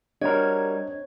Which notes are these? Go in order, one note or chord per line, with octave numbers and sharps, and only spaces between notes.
G3 C4 D4 F#4 A#4 C#5 D#5 G#6